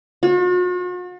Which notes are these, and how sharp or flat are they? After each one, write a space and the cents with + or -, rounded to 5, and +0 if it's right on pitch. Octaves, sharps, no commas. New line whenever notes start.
F#4 -45